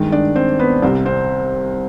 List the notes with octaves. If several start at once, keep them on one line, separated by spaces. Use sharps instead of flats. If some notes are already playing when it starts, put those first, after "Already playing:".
Already playing: G2 D#3 G#3
D4 D5
C4 C5
B3 B4
C2 C3 G3 C4 C5
C4 C5